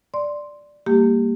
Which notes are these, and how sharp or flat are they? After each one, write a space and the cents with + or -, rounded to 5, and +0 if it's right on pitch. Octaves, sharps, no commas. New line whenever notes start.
D5 +0 C6 +0
G3 +15 A#3 -20 G4 +10